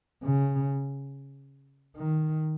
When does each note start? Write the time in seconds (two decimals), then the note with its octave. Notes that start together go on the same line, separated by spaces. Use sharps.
0.23 C#3
1.96 D#3